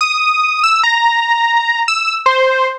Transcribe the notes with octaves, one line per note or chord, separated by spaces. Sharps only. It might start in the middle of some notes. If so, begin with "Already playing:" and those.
D#6
E6
A#5
E6
C5